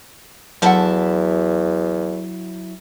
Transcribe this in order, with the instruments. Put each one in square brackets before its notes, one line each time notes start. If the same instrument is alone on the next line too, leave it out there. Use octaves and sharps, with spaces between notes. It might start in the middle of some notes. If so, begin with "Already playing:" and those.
[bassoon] E2 [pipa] F3 A4 F#5 [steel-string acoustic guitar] F#3 E4 E5